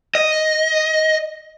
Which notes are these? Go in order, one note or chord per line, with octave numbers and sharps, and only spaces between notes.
D#5